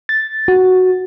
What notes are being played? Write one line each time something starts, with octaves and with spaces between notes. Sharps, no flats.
A6
F#4